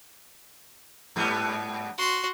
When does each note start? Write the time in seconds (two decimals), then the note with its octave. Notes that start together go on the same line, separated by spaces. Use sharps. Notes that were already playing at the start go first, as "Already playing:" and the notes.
1.16 G#2 G3 B3
1.98 F#4 C6